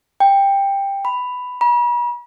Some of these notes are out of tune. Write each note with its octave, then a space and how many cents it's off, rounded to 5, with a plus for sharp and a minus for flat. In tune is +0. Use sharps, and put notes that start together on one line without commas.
G5 +15
B5 +10
B5 -40